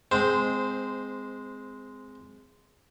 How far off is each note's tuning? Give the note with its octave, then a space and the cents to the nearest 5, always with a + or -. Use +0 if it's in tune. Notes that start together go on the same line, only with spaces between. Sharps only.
G#3 +0 C4 -20 C5 +0